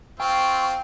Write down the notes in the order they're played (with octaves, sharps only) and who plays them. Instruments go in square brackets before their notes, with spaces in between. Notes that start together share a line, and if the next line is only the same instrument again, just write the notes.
[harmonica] C4 F4 [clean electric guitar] G5 [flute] C#6